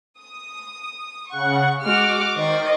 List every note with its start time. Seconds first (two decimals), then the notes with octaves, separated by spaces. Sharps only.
0.19 D#6
1.29 C#3 F#5 C#6
1.83 G#3 F#4 D6 F6
2.35 D#3 C5 D5 D#5 C#6